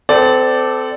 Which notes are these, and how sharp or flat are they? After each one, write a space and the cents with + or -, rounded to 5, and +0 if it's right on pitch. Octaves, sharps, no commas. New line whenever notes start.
C4 -30 A4 -5 D5 +0